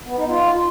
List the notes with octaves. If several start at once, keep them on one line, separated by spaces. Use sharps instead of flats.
B3
D#4
F4